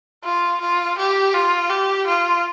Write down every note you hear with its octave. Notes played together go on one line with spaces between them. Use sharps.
F4
F4
G4
F4
G4
F4